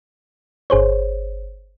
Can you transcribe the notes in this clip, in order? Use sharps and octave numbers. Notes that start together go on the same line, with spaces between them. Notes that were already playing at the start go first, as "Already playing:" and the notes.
G1 G#4 C5 C#5